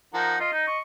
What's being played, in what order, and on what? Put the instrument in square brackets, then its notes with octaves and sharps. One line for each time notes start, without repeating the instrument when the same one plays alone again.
[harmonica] F3 A#4 F#5 [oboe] D#4
[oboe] F4 [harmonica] D#5
[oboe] D#4
C#6